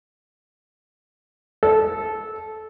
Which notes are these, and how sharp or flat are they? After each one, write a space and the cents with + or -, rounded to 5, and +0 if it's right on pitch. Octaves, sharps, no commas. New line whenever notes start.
A4 -15